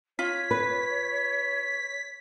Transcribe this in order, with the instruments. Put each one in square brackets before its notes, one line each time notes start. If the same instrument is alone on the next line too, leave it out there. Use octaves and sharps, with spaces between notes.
[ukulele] F4 [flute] C#5 [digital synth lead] B6
[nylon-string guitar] B4